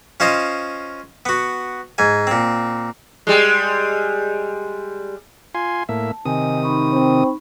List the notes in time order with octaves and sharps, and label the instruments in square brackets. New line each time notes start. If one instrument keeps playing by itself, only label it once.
[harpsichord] C#4 F4 C5 D#5
B3 F#4
G#2 G#5
A#2 C4
[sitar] G3 G#3
[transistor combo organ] F4 G#5 C6
[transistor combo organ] A2 A#3 E5 [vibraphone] A5
[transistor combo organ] C3 D#3 D#6 [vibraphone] D#5 G#5
[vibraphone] D#4 B5 C#6
[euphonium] C4